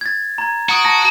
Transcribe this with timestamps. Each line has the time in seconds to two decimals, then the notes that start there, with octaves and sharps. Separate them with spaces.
0.01 G#6 A6
0.38 A#5 G#6
0.69 F#4 A#5 D#6 D7
0.85 A5 A#5 A#6